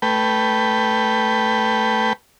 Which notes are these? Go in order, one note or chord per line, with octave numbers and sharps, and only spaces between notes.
A3 B4 G5